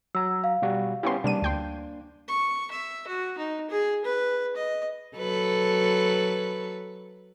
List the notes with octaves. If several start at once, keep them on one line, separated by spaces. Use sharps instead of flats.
F#3 A#5 E6
F5
B2 G3 F#4
B3 C#4 E4 G4 C6
C3 G3 A#3 D4 D#7
D2 G5 C6
C#6
E5
F#4
D#4
G#4
B4
D#5
F#3 A4 B4